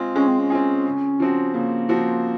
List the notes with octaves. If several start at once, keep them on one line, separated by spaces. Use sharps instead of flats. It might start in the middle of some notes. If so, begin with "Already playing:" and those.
Already playing: G#3 C4 F4 G#4
G#3 C#4
C4
C#4
C4 F4 G#4
C#3
F3 C4 F#4
C#3 A#3
F3 C4 F#4